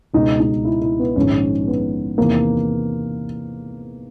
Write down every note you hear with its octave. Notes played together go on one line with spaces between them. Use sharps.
C#2 B2 G#3 D#4
D#4
E4
E4
B3
A#1 G#2 D#3 G#3 C#4
B3
E2 C3 D#3 A#3